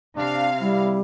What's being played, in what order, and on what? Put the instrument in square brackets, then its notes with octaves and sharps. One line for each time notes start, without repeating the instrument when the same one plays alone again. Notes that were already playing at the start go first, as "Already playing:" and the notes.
[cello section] C3 F5 [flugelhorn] D4
[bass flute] G3 [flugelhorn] E4